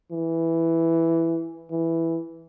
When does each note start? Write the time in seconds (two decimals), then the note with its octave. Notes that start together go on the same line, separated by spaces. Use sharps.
0.11 E3
1.71 E3